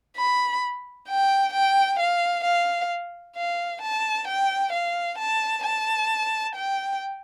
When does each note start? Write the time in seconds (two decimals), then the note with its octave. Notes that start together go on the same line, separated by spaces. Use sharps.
0.16 B5
1.08 G5
1.53 G5
1.99 F5
2.44 F5
3.36 F5
3.82 A5
4.27 G5
4.72 F5
5.18 A5
5.64 A5
6.55 G5